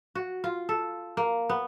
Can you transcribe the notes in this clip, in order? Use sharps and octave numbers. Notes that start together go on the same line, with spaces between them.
F#4
F4
A4
A#3
B3